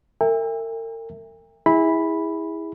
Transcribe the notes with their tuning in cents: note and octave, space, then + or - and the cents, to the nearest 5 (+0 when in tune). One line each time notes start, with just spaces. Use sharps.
A#4 -40 E5 +0 G5 +45
E4 -20 G#4 -25 B5 +0